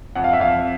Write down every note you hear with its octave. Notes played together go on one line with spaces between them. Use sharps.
F2 F#5
F5
E5
F2 F5